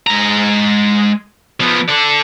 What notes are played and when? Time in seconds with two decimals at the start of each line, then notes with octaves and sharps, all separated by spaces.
0.07 G#3 A#5
1.60 F3 B3
1.88 A4 D5